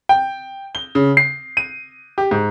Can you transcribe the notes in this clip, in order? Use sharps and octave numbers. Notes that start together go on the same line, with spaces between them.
G5
G7
C#3
C7
D#7
G4
G#2